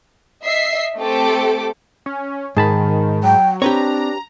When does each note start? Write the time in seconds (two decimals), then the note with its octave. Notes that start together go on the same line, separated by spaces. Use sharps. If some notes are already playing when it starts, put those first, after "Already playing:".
0.43 D#5 E5 C7
0.98 A3 C4 G4 A4 D6
2.06 C#4
2.57 G#2 D#3 G#4 A5 B5
3.24 F#3 G5
3.62 C4 D4 G4 B4 C#5 A#5